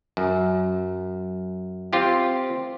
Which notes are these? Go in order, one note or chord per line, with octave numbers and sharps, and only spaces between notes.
F#2
C4 F4 G4